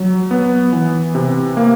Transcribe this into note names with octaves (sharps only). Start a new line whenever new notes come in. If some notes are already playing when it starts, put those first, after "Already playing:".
Already playing: F#3
B3
E3
C3
A#3